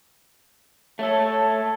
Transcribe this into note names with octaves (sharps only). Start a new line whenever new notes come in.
A3 A4 C#5